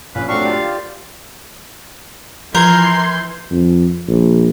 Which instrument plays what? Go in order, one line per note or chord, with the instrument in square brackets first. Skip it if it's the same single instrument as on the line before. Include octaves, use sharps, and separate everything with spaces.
[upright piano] A#1 [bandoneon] C#4 F5 [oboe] B4
[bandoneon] F#3 C4 F#4 [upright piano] A3 D4 [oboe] F5 [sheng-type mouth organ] C#6
[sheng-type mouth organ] F4 G4 [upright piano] D5
[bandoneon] D#3
[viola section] E3 C6 [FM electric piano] F3 [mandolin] A#4 [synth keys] G6 G#6
[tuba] F2
A#1